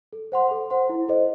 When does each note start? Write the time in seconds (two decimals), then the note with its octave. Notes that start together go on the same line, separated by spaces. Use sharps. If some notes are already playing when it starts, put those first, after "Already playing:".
0.13 A4
0.32 C5 F#5 C6
0.51 A4
0.70 C5 F#5 C6
0.89 E4
1.08 A4 C5 D#5